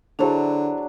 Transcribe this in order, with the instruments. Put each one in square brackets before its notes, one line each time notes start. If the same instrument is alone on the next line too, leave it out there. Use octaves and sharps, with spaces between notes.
[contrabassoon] D3 [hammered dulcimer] F#3 D4 [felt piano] E4 C5 A5 [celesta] G#4 F7